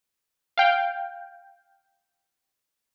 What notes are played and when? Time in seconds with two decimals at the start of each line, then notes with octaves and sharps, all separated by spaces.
0.58 F5 G5